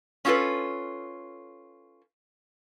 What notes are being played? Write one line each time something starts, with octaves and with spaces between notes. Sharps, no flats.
C#4 D#4 F4 F#4 A4 B4